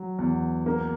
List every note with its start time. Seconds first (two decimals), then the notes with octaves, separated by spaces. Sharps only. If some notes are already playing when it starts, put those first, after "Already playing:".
Already playing: F#3
0.19 E2
0.66 A#3